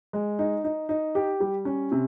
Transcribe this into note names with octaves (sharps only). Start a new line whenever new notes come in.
G#3
D#4
D#4
D#4
G4
G3
C#4
C3